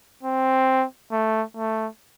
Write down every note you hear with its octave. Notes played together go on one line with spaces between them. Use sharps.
C4
A3
A3